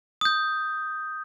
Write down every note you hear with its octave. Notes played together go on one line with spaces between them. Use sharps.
D#6 G6